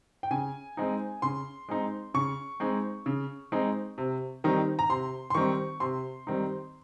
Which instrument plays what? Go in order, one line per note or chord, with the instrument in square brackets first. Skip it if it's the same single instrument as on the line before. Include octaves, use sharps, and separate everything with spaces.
[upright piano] G5
C#3 G#5
G#3 C4 D#4
C#3 C6
G#3 C4 D#4
C#3 C#6
G#3 C4 D#4
C#3
G#3 C4 D#4
C3
D#3 G3 C4 D#4
A#5
C3 C6
C6
D#3 G3 C4 D#4 C#6
C3 C6
D#3 G3 C4 D#4